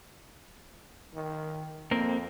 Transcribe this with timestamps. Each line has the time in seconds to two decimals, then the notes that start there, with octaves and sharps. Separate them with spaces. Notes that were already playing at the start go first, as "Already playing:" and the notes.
1.14 D#3
1.91 F2 A#3 C4